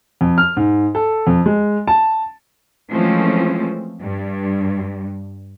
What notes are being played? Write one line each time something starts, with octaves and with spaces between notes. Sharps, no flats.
F2
F6
G#2
A4
F2
G#3
A5
E3 F3 G#3 A3 C4 C#4
G2